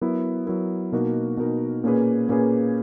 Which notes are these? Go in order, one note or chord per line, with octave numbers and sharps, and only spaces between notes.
F#3 B3 E4 A#4
F#3 B3 E4 A#4
B2 A#3 D#4 F#4 A#4
B2 A#3 D#4 F#4 A#4
A#2 A#3 C#4 G#4 B4
A#2 A#3 C#4 G#4 B4